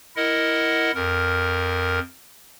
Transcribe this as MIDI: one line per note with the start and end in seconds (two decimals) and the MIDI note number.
0.16 0.91 64
0.16 0.91 70
0.16 0.91 75
0.16 0.91 78
0.95 2.00 41
0.95 2.00 70